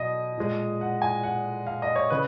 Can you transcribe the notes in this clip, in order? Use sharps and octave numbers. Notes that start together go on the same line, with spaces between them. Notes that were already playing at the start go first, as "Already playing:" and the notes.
Already playing: B2 F#3 D#5
A#2 G#3
F#5
G#5
F#5
F5
D#5
C#5
C#3 B4